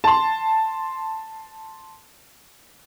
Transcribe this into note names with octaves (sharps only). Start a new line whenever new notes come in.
A5 C6